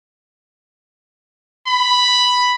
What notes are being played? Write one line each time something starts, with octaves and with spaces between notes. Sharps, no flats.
B5